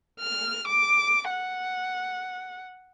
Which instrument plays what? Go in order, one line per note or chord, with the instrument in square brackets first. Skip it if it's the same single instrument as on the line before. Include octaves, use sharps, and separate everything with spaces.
[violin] F6
D6
F#5